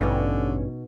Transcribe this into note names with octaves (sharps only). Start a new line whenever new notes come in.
A1 G2 B2 D3 C#4 D#4 D#5